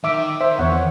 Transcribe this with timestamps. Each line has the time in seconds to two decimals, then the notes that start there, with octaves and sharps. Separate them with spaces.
0.04 D#3 E5 D6
0.41 C5 E5
0.59 E2 C#5 F#5